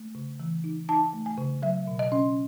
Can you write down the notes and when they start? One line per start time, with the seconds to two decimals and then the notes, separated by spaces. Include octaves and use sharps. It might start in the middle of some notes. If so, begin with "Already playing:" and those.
Already playing: A3
0.15 C#3
0.40 E3
0.64 D#4
0.89 D#4 A5
1.13 A3
1.26 G#5
1.38 C#3
1.63 F#3 E5
1.87 B2
1.99 D#5
2.12 C#4